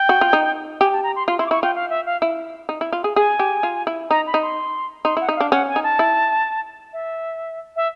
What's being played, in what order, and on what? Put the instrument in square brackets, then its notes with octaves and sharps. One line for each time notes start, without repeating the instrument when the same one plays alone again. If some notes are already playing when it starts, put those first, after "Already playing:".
Already playing: [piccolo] G5
[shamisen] F#4
F4
D#4
[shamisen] G4 [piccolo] G#5
[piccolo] A5
A#5
C6
[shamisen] F4 [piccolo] C6
[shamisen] E4 [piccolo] C6
[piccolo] D6
[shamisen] E4 [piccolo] C#6
[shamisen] F4 [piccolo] G5
[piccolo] F5
E5
F5
[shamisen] E4
D#4
E4
F4
G#4
[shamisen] G#4 [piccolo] G#5
[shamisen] G4
F4
E4
[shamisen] D#4 [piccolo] A#5
[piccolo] B5
[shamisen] D#4
[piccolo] C6
[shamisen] D#4 [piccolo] C6
[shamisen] E4 [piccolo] F#5
[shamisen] D#4 [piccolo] E5
[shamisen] D4 [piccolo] F5
[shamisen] C#4 [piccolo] F#5
[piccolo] G#5
[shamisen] D#4
[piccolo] A5
[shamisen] E4
[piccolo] E5
E5